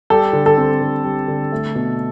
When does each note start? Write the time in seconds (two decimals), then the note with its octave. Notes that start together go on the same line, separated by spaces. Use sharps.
0.10 G3 A4
0.33 D3
0.46 A4
0.58 C4
0.81 D3
1.04 G3
1.28 D3
1.52 A3
1.75 B2